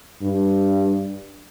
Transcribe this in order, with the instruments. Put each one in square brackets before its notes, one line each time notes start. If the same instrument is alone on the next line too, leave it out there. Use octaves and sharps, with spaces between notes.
[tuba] G2